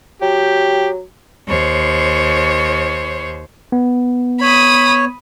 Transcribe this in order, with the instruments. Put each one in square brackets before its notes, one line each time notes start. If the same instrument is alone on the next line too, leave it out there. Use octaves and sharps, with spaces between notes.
[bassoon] F#3 [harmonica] G4
[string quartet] D#2 C5 C#5
[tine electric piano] B3
[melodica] C#5 [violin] B5 D#6